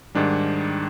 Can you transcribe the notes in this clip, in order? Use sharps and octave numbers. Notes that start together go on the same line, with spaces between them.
G#2 D#3 G3 D4